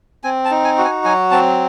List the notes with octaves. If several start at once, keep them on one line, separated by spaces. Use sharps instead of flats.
C4 G#5
A5
D#4
G#5
F#4
G#5
F#3 G#5
C4 A5